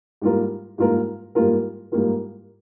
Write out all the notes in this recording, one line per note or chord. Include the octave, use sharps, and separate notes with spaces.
G#2 G3 A#3 F4 A#4
G#2 G3 A#3 F4 A#4
G#2 G3 A#3 F4 A#4
G#2 G3 A#3 F4 A#4